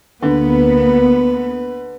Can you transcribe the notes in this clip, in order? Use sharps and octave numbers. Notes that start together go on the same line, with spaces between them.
D2 D3 A#3 B3 B4